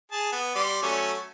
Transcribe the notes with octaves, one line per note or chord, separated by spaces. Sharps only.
G#4 A5
B3
G3 D5 C6
F#3 A3 C#4